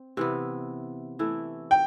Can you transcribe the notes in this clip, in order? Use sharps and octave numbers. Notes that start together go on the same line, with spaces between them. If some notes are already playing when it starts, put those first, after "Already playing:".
Already playing: C4
C3 E3 B3
E3 A3 E4
G5